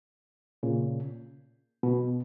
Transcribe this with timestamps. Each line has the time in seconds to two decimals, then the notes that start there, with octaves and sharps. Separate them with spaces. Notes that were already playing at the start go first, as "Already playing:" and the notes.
0.63 A#2 C#3
1.83 B2